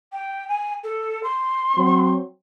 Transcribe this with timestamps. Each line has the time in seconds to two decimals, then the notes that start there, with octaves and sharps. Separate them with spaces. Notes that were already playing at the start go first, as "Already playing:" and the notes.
0.13 G5
0.49 G#5
0.84 A4
1.23 C6
1.77 F#3 C4